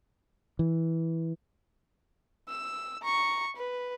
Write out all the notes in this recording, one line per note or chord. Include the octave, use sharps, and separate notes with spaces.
E3
E6
A#5 C#6
B4